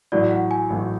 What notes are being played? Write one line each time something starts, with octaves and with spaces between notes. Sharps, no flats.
A1 A2 F#3 D5
F#5
G#5
A1 A2 F#3